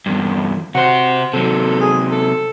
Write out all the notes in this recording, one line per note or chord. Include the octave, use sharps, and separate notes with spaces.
E2 G2
C3 F#4 C5
C3 F#3 A4
G#4
A4